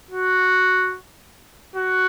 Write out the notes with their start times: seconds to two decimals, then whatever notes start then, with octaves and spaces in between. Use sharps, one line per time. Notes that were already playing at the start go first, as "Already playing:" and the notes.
0.11 F#4
1.76 F#4